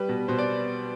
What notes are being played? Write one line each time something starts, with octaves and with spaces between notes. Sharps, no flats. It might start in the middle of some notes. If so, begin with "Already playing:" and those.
Already playing: G3 B4
B2
B2 C5
D5